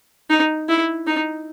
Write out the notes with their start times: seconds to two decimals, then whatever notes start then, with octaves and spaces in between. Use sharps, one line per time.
0.30 D#4
0.69 E4
1.07 D#4